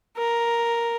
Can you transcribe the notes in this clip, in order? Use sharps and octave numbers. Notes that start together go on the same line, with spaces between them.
A#4